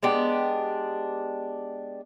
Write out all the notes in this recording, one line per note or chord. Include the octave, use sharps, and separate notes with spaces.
G#3 B3 D4 G4